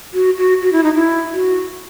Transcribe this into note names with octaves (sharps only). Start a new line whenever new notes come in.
F#4
F#4
F#4
E4
D#4
E4
F#4